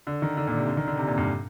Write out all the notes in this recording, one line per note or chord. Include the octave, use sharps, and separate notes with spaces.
D3
D#3
D3
A#2
C3
D3
D#3
D3
C3
A#2
G2